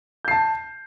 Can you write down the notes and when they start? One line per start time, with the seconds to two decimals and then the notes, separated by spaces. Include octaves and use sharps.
0.25 G6
0.28 C7
0.31 A5